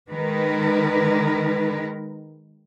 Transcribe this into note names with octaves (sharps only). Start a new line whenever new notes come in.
D#3 G#3 A#4 B4